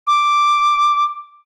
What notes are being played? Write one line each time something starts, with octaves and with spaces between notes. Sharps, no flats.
D6